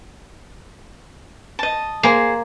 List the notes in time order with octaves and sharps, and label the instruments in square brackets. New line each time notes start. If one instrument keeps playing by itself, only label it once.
[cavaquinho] D#5 A5
[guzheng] A#3 [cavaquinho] G#4 C5